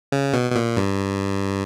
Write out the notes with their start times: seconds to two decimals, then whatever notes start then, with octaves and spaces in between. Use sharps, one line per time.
0.12 C#3
0.33 B2
0.52 B2
0.56 A#2
0.76 G2